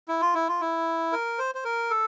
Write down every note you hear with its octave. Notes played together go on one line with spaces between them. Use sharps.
E4
F4
E4
F4
E4
A#4
C5
C5
A#4
A4